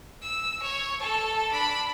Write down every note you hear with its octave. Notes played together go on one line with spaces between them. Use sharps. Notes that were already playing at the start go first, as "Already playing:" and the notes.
E6
C#5
A4 A5
D4 B5